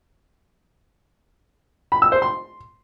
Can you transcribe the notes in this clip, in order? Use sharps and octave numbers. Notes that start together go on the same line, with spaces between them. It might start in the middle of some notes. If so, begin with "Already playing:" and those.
B5
E6
C5
C6